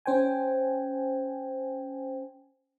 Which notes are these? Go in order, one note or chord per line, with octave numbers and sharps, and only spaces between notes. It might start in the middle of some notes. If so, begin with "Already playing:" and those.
C#4 C5 G5 G#5